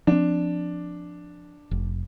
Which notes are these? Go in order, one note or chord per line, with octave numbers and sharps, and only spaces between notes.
F3 C4 D4
F1